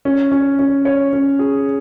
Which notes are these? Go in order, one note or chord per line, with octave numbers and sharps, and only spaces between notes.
C#4
C#4
C#4
C#5
C#4
G#4